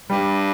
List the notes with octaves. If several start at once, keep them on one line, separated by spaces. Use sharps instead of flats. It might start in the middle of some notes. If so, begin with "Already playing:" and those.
G2 G3